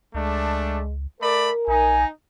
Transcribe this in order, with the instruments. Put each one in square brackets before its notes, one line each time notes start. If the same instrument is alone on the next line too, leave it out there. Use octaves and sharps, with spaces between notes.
[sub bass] C#2 [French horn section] G#3 [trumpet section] A3 D4
[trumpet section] A3 D5 B5 [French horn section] A#4
[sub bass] A#1 [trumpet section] D#4 [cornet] G#5